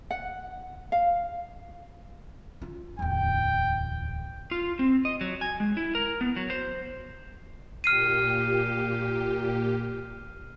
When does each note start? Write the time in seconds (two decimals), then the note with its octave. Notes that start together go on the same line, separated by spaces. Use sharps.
0.11 F#5
0.92 F5
2.62 F4
2.99 D1 E2 G5
4.51 F4
4.79 C4
5.05 D#5
5.21 F#3
5.41 G#5
5.60 G#3
5.77 E4
5.95 A#4
6.21 B3
6.36 F#3
6.50 C5
7.84 A#2 G4 F6 C7 D#7